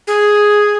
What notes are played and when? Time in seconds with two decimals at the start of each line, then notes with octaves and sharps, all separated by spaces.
0.07 G#4